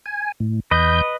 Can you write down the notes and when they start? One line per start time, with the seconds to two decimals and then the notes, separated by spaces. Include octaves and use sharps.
0.06 G#5
0.40 A2
0.71 E2 B4 D#5 G6